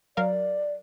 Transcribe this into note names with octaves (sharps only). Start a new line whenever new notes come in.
F#3 A#4 D5 F5